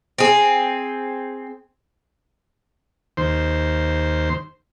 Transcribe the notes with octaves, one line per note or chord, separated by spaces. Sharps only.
C4 G#4
D#2 C5